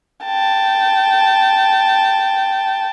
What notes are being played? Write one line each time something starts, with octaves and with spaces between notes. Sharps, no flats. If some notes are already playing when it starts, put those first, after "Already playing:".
G5 A5